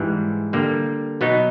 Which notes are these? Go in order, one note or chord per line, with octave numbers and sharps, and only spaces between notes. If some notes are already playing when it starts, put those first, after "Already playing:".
Already playing: G#2 E3 G3
D3 G3 A#3
B2 F#3 B3 D#4